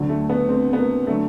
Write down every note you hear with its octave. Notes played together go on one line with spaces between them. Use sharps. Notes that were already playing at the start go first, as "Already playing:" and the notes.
Already playing: D2 D3 F#3
A3
B3
C4
B3
A#3
D3 F#3 A3